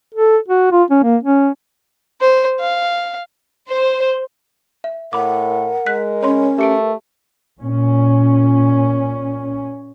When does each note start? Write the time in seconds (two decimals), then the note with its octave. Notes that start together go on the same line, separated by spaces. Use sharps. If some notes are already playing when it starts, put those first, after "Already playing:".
0.14 A4
0.48 F#4
0.72 F4
0.90 C#4
1.03 A#3
1.23 C#4
2.21 C5
2.60 F5
3.68 C5
4.84 E5
5.13 A2 A#4 F#5 B5 D6
5.86 G#3 F#6 B6
6.23 C#4 C#5 B5 C6
6.59 A3 G4 C#7 D7
7.60 A#2 C#4